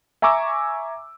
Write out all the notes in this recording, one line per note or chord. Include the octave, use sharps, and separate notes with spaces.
E5 G#5 A#5 C#6 D6 E6